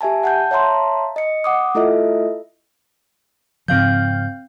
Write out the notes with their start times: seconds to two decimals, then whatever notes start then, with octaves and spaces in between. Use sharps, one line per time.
0.01 G4 E5 G#5 A5
0.23 F#5 A5 G6
0.51 C#5 E5 F5 A5 A#5 C6
1.16 D#5 C#7
1.44 F#5 D6 D#6
1.75 A3 E4 F4 A4 D#5 E5
3.68 G#2 C#3 F3 C4 F5 G6